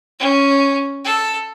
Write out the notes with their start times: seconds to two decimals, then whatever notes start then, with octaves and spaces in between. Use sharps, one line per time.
0.19 C#4
1.04 A4